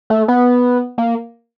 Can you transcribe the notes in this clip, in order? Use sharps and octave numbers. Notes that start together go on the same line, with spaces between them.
A3
B3
A#3